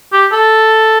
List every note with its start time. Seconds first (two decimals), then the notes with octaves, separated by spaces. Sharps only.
0.12 G4
0.32 A4